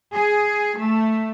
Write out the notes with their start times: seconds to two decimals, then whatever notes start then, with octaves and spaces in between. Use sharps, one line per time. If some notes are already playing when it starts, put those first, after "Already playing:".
0.12 G#4
0.78 A3